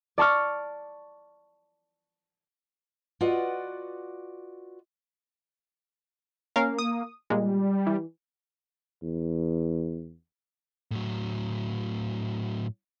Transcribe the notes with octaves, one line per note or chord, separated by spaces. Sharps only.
D5 A5 C#6 F6
F4 F#4 B4 D5 D#5 F#5
A#3 C#4 A#4 F5
D#6
A#2 G3 G#3
E3
E2
A2 F#3